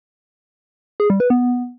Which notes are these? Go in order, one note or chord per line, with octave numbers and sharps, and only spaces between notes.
G#4
G3
B4
B3